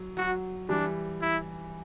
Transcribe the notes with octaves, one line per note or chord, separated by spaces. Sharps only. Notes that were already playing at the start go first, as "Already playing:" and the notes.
Already playing: F#3
F#3 F#4
E3 G3 D4
E4